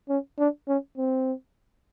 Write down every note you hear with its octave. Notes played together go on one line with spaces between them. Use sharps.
C#4
D4
C#4
C4